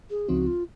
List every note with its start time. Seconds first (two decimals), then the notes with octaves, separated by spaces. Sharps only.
0.10 G#4
0.28 C#2 C#3 F3 C4 D#4 F#4
0.47 F4